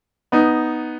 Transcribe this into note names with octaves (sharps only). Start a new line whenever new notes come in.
B3 D#4